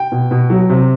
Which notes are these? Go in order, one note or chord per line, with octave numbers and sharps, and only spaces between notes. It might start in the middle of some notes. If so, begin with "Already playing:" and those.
Already playing: G5
B2
B2
F#3
C3